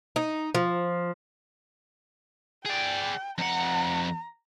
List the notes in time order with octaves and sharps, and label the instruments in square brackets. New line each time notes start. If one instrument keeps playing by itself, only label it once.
[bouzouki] D#4
F3
[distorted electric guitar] G#4 D5 [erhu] G5
[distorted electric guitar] F2 F#5 [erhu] A#5